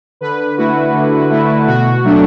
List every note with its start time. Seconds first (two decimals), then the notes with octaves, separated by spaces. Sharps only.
0.21 D3 B4
0.58 A3 E4 F#4
0.94 D3
1.30 A3 E4
1.68 B2 F#4
2.04 F#3 A3 D4